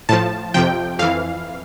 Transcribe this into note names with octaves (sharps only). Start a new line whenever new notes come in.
A2 F3 A5
F2 C3 F3 G5
F2 E3 F5